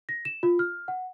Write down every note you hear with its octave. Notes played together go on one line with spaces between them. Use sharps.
A#6
E7
F4
F6
F#5